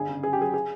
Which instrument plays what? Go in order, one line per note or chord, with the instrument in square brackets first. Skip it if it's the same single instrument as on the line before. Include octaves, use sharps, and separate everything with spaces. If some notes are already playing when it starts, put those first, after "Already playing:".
Already playing: [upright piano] G1 G#4
C#3
F#2 G#4
G4
F#3 G#4
G#4